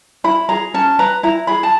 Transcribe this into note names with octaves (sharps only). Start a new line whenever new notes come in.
E4 B5
G#4 A#5
C#4 A5
B4 A#5
E4 A#5
G#4 B5
A5